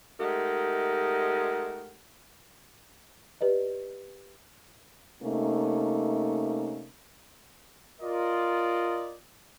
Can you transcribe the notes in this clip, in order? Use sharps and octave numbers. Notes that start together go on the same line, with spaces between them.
G#3 A3 D#4 G4 A#4 F#5
G4 B4 D5 D#5
C3 A3 A#3 C#4 D#4
F4 A#4 D5 D#5